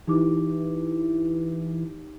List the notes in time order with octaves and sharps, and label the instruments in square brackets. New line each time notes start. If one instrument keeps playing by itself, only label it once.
[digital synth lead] E3 [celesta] D#4 G4 D6